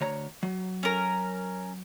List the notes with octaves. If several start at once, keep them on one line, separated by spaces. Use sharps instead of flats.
D2 C#5 A#5
F#3
C#4 A#4